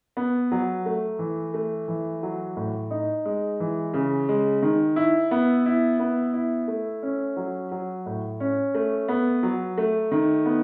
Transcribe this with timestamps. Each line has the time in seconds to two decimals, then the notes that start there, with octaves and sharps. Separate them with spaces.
0.17 B3
0.52 F#3
0.86 A3
1.19 E3
1.54 A3
1.88 E3
2.23 F#3
2.57 A2
2.91 D#4
3.25 G#3
3.60 E3
3.94 C#3
4.29 G#3
4.63 D#3
4.96 E4
5.31 B3
5.66 E4
6.00 B3
6.34 E4
6.68 A3
7.03 C#4
7.37 F#3
7.71 F#3
8.06 A2
8.40 C#4
8.75 A3
9.08 B3
9.43 F#3
9.78 A3
10.12 D#3
10.45 B3